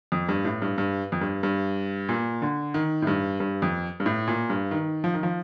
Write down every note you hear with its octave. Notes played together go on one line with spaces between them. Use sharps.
F2
G2
A2
G2
G2
F2
G2
G2
A#2
D3
D#3
A2
G2
G2
F2
G2
A2
A#2
G2
D#3
F3
D#3
F3